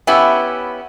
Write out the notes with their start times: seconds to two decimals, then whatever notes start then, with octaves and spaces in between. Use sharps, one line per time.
0.07 B3 C#4 E4 G4